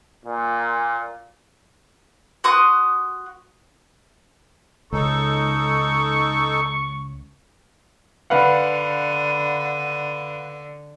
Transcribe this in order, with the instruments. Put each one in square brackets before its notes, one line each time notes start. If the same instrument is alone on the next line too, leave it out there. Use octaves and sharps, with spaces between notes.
[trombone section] A#2
[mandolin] F#4 C6 D#6 F#6
[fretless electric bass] C#2 [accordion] D#4 A4 [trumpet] C#6
[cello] D3 [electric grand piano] B4 F5 F#5